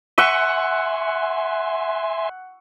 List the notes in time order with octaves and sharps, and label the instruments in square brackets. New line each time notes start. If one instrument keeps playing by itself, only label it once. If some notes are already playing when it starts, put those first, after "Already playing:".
[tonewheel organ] E5 G#5 C6 [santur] F#5 C#6 E6